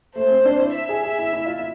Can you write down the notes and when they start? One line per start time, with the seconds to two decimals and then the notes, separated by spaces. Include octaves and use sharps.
0.15 A3 C5
0.30 C4
0.45 D4
0.60 E4
0.74 E5
0.89 G#4
1.04 G#4
1.18 E4
1.33 E4
1.46 F4
1.59 E4